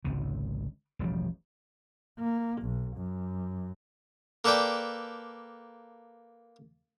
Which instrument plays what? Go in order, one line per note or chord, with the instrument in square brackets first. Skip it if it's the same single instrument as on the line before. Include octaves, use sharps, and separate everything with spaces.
[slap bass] G#1 C#2 C3
E1 A1 F3 G3
[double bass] A#3
B1
F#2
[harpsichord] A#3 A4 B4 D5 G5